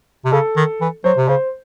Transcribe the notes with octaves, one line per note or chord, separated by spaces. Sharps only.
C3
C#3 A4
D#3
E3
F#3 C5
C3
C#3 C5